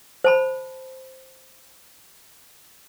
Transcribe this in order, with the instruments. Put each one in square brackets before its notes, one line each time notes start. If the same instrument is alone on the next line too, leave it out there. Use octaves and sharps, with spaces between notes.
[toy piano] C5 A5 B5